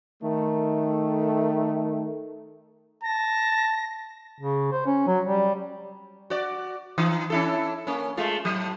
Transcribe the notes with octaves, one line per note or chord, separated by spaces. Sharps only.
D#3 A3
A5 A#6
C#3
C5
C#4
F#3
G3
F#4 D5
E3 D#4
C#4 E4 A4
A#3 C#4
G#3 A3 F4
A2 F#3